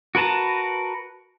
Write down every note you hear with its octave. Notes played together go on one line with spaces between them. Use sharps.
F#4 A#4 B4 A5 A#5